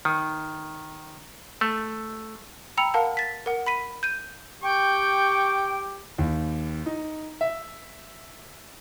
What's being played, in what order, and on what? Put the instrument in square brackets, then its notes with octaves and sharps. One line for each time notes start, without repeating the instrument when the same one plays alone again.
[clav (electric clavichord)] D#3
A3
[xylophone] G5 A#5 B5 E6 C#7 F7
A#4 F5 F#5 A5
A6 B6
A#4 F#5
B5 B6 D#7
G6 D#7
[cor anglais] G4 [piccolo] G5 [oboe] C#6
[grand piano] D#2
D#4
E5